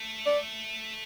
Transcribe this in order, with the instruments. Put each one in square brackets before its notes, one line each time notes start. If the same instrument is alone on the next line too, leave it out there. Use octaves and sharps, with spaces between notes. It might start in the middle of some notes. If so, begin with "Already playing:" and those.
Already playing: [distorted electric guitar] A3
[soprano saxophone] D5